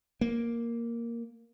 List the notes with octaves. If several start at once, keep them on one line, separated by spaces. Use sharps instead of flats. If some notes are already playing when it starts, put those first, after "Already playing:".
A#3